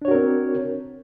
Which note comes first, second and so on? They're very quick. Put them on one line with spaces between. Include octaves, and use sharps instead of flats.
D4 C#5 F#4 A#4 C4